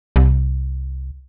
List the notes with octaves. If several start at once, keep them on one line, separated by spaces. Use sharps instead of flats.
C2